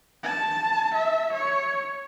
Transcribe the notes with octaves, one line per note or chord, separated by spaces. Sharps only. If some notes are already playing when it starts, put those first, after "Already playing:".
A5
E5
C#5